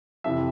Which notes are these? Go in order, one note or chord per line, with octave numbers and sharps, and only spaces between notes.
F2 C3 E3 E5